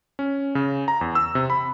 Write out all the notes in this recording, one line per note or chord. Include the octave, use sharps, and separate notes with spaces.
C#4
C#3
A#5
E2
E6
C3
B5